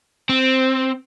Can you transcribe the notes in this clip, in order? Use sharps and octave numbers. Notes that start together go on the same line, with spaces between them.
C4